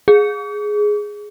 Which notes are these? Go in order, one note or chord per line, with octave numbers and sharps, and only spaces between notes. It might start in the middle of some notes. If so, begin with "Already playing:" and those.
G#4